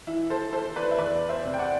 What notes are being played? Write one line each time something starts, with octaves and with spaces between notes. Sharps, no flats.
E3 E4
A4 C5
E3 A4 C5
B4 D5
E5
E2 B4 D5
C5 E5
C3
G5
D5 F#5